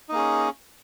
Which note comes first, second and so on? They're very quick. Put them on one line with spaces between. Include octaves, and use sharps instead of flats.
D#4 A#3 G#4 C#4